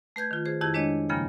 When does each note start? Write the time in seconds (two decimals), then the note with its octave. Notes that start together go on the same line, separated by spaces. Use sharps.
0.16 A3 B4 G6 G#6
0.31 D#3 F4
0.46 G#4 C5
0.61 F2 D#3 E4 G4 G#6
0.74 G#3 D4 C#5 D#5
1.09 E2 G2 C#3 F3 A#3 G5